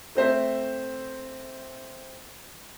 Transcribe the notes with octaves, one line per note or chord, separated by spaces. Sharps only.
A3 C4 C5 E5